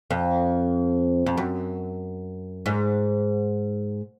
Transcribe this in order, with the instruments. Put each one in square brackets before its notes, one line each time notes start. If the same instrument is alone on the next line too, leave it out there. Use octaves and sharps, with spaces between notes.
[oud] F2
F2
F#2
G#2